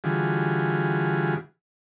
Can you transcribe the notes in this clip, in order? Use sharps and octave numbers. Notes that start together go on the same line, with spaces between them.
D3 E3 G3 F4 F#4 G#4